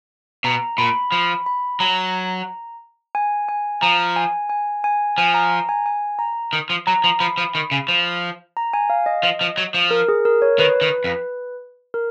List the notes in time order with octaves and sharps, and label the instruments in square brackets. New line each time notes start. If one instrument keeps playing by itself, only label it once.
[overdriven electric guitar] B2 [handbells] A#5
[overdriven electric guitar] A#2 [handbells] B5
[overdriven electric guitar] F3 [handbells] B5
[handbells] B5
[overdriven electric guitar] F#3 [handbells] A#5
[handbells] G#5
G#5
[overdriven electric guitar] F3 [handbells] A#5
[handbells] G#5
G#5
G#5
[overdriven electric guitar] F3 [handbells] G#5
[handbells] A#5
A#5
G#5
G#5
A#5
[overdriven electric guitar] D#3
F3
[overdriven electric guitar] F#3 [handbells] A#5
[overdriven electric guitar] F3
[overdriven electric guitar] F3 [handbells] B5
[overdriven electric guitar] F3
D#3
C#3
F3
[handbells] A#5
G#5
F5
D#5
[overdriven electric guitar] F3
F3
F#3
F3
[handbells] A#4
G#4
A#4
C#5
[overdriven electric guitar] D#3 [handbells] B4
[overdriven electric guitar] D#3
F2
[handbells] A#4